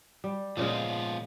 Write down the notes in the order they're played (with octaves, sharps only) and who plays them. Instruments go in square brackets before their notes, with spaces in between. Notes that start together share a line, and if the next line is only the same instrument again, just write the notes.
[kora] G3
[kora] A#2 C#3 G#3 [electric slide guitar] F3 B3 F4